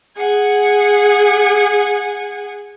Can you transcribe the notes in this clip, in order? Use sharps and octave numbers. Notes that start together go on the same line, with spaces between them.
G#4 F#5 G#5